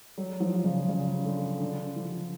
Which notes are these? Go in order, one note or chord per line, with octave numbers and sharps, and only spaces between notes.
F#3
F3
C#3
C#3
D3
D3
F3